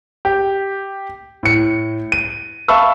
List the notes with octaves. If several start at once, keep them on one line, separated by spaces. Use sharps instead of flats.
G4
A2 C#7
D#7
E5 F5 A5 B5 C#6 E6